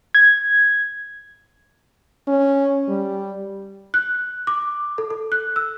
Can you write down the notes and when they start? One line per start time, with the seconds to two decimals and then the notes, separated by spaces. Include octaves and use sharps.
0.15 G#6
2.28 C#4
2.88 G3
3.94 F#6
4.47 D6
4.98 A4
5.10 A4
5.32 F#6
5.56 E6